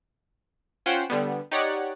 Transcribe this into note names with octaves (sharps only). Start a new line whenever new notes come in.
C#4 F4 C5 F#5 G5
D3 G3 B3
D#4 G4 C#5 D5 F#5